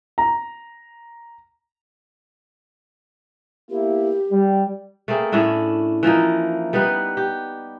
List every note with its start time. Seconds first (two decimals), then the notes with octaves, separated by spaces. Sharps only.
0.18 A#5
3.70 A#3 B3 E4 G4
4.32 G3
5.08 A3 A#3 C4 G#4
5.32 A2 C#4 D4 E4
6.03 E3 F3 A#3 D#4
6.73 G3 B3 D#4 B4
7.17 G4